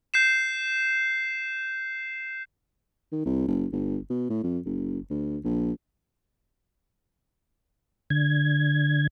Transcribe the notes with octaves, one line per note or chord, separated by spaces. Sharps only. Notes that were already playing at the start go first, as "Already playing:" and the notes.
G6 C7 E7
D#3
C2
F#1
G1
B2
A2
F2
F#1
D2
A#1
D3 G#6